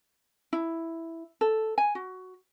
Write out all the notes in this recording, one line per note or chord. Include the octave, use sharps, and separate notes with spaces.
E4
A4
G#5
F#4